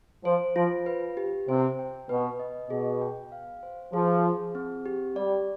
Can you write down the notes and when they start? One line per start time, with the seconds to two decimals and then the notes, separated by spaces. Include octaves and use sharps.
0.25 F3 C5
0.56 F3 F4
0.86 B4
1.17 G4
1.48 C3 C5
1.79 G5
2.09 B2 B4
2.39 D#5
2.70 B2 G#4
3.01 G5
3.32 F5
3.63 C5
3.93 F3 G#4
4.24 G#4
4.55 C4
4.86 G4
5.16 G3 D5